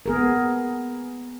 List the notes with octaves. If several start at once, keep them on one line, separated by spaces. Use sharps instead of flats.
B3 G#4 A#4